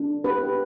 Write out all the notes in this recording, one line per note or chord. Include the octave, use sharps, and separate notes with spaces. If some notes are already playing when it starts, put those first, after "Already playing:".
Already playing: D4
G4 B4